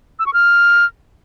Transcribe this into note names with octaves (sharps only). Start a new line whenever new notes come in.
E6
C#6
F6